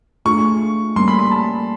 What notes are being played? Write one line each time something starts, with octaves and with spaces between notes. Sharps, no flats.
A3 D4 F4 G#4 C#6
G3 A#3 C#4 C6
B5
B5
A5